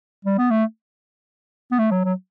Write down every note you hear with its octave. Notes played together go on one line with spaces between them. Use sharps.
G3
B3
A3
B3
A3
F#3
F#3